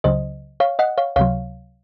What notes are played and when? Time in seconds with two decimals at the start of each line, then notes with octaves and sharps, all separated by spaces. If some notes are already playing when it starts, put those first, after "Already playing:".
0.04 C#2 C#3 F#3 C5 D#5
0.60 C#5 F5
0.79 D#5 F#5
0.98 C#5 F5
1.16 C#2 C3 F#3 C#5 F5